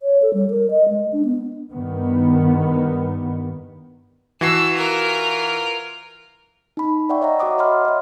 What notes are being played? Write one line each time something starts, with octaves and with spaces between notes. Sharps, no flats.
C#5
A4
G3
A#4
D#5
G#3
D4
B3
G2 D#3 B3
E3 F#4 A5 E6 C7
F4 A#4
D#4 B5
D5 E5 F#5 G5 C#6
C#5 D#5 E5 F#5 A#5
F#4 C#5 F#5 D6 D#6
D#5 F#5 B5 C6 F6
C#5 E5